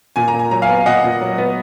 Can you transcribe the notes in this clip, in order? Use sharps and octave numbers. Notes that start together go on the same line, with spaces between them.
A#2 G#5
A#5
A#2
G#5
F#3 A#5
F5 G#5
B3
A#2 D#5 F#5
A#2
F#3
B3